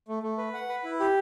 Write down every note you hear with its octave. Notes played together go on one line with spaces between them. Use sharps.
A3
A3
B4
F#5
B4
E4
G4